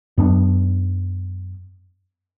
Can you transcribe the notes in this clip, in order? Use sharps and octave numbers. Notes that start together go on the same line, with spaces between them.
F#2 B3 D4